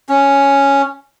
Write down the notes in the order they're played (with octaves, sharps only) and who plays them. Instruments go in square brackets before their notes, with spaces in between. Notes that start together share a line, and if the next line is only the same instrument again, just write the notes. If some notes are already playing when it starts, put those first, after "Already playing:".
[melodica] C#4